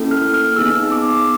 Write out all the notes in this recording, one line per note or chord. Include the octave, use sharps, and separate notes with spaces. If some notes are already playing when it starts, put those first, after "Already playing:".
Already playing: A#3 C#4 E4 A4
F6
F6
B3 D#4 G#4 E6
D6